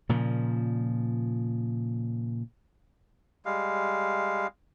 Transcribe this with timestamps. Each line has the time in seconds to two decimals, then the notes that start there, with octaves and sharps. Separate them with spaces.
0.09 A#2 C#3 F3
3.45 G3 G#3 F5